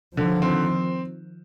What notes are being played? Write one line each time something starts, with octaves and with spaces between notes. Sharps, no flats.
D3 D#3 F3
C4